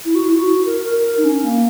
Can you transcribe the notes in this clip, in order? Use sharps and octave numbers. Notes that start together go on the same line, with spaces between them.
E4
F#4
E4
F#4
A#4
A#4
D#4
C#4
A#3